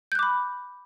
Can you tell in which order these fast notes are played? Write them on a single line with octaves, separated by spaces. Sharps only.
G6 F#6 D6 B5